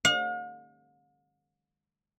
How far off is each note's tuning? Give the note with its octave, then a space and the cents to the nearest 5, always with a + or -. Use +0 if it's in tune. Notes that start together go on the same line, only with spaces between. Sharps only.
F5 +45